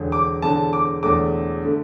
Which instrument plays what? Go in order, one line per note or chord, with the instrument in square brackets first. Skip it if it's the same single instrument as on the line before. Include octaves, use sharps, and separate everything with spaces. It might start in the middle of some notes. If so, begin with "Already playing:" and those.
Already playing: [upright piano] E1 E2 D3
D6
E1 E2 D3 A5
D6
E1 E2 D3 A3 D6
D3 A3